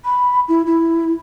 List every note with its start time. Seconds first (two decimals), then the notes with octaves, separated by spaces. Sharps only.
0.05 B5
0.49 E4
0.66 E4